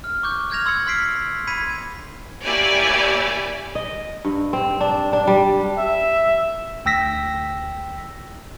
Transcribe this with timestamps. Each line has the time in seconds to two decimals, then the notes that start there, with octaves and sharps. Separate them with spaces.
0.04 F6
0.23 C#6 D6 F#6 G6
0.50 F6 G6 G#6 A#6 F7
0.66 C6 E6 G#6 C#7
0.87 C6 F6 B6 C7 D7
1.47 B5 G#6 B6 C#7 D#7
2.45 A#3 E4 G4 C#5 D5 G#5
3.75 D#5
4.25 G2
4.53 C4
4.80 D4
5.13 D4
5.27 G3
5.77 E5
6.85 D2 G5 E6 A#6 B6